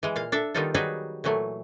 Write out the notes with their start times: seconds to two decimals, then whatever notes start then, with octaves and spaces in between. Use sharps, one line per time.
0.03 E3 G#3
0.16 A#2 F5
0.32 D4 A4 E5
0.54 D#3 G3 B3 D#4 F4 A4
0.74 F#3 G3 D#4 F#4 G#4 B4
1.24 A#2 E3 F#3 A3